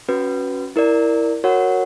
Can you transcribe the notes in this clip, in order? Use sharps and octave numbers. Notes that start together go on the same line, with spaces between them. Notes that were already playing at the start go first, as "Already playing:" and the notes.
C#4 F#4 B4
E4 A#4 D5
F#4 A#4 C#5 F#5